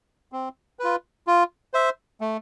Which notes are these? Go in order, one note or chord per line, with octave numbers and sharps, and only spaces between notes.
C4
F4 B4
F4
C5 E5
A3